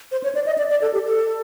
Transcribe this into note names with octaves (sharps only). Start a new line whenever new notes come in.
C5
C#5
D5
D#5
D5
D5
A4
G4
A4